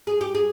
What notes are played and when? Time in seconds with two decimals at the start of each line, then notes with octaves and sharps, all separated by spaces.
0.07 G#4
0.21 G4
0.35 G#4